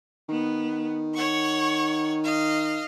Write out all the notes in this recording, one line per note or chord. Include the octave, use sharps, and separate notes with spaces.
D#3 B3
C#5 F#5 C#6
D#5 F5